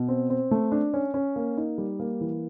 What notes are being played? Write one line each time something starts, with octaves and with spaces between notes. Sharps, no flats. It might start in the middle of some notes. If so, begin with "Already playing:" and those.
Already playing: B2
C4
C4
A3
D4
C#4
C#4
A#3
D#4
G3
A#3
E3